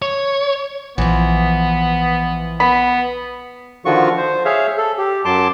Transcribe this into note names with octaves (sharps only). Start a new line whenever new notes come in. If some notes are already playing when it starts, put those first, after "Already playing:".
C#5
A#1 E3 F3 B3
B3 B5
D3 D#3 F3 F4 F#4 C#6
C5
G#4 C#5 E5 F5
A4
G4
F#2 F#3 A5 C6 D6